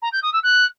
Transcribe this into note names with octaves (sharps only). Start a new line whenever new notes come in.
A#5
G6
D#6
E6
F#6